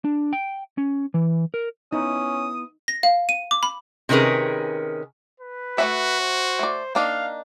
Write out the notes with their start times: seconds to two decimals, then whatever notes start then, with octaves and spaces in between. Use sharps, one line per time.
0.05 D4
0.33 G5
0.78 C#4
1.14 E3
1.54 A#4
1.92 B3 C#4 D#4 E4 D#6
2.88 A#6
3.03 F5
3.29 D#7
3.51 D6
3.63 B5
4.09 C3 D#3 C#4 G#4 A#4 B4
5.40 B4
5.78 A3 C#4 F#4 E5
6.20 C5
6.59 A3 D5
6.95 A#3 D4 D#4 F5